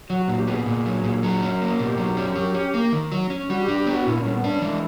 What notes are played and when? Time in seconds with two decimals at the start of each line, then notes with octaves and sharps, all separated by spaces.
0.10 F#3 F#4
0.23 A#2 F#4
0.37 G4
0.47 B3 G#4
0.66 A#2
0.86 F#3
1.04 A#2
1.23 F#3
1.42 C#4
1.61 A#3
1.79 B2 G4
1.98 F#3
2.17 C#4
2.36 F#3
2.55 C#4
2.74 A#3
2.93 D#3
3.12 F#3
3.30 C#4
3.50 G3 F#4
3.64 D4 G4
3.77 G4
3.87 B3
3.92 F#4
4.06 A#2 E4
4.20 C#4
4.25 G3
4.35 B3
4.44 C#4 D4
4.62 E3 G#3